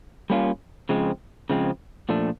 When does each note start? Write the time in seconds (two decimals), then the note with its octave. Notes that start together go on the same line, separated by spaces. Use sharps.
0.30 G3 A#3 C#4 F4
0.89 C#3 F3 G#3 C4
1.50 C#3 F3 G#3 C4
2.09 A#2 F3 A3 D4